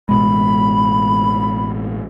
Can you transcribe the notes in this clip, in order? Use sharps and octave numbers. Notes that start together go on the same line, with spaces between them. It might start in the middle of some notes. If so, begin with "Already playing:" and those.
A1 B2 G#3 B5